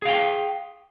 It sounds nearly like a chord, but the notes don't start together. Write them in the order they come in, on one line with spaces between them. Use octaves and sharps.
G#4 F5 G5